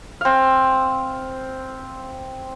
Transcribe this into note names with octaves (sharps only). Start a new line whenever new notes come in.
C4 F5